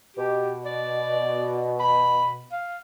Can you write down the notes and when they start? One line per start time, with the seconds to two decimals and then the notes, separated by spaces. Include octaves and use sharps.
0.17 B2 G4
0.65 D5
1.80 B5
2.52 F5